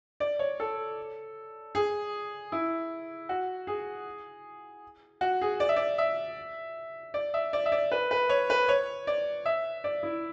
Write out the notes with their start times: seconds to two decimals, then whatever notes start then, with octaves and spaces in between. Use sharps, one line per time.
0.20 D5
0.39 C#5
0.60 A4
1.75 G#4
2.52 E4
3.29 F#4
3.67 G#4
5.21 F#4
5.41 G#4
5.60 D5
5.69 E5
5.76 D5
5.98 E5
7.14 D5
7.34 E5
7.53 D5
7.66 E5
7.72 D5
7.92 B4
8.11 B4
8.29 C#5
8.50 B4
8.69 C#5
9.07 D5
9.46 E5
9.84 D5
10.03 E4